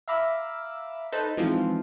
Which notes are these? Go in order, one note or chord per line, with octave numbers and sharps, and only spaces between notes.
E5 F5 A#5 B5 D6 E6
D#4 A4 B4 C5 A5
G#2 E3 F3 G#3 C4 F4